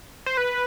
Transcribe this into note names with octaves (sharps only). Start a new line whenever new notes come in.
C5
B4